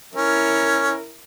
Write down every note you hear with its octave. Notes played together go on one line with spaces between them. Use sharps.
C#4 E4 A#4